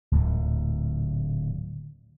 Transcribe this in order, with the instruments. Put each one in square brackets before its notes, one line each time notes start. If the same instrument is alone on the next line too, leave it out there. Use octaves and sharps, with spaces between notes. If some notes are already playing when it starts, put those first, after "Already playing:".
[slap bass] D1 D2 A#2